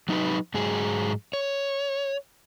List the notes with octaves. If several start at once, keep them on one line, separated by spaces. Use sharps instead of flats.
F#3 D#4 G4 B4
G#2 F#3 G#4
C#5